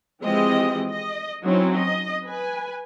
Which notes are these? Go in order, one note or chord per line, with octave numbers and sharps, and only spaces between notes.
E3 F3 G#3 C4 G4 D#5
D#5
F#3 C4 C#4 D#4 E4
D#5
B4 G#5